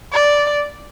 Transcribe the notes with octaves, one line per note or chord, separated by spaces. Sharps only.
D5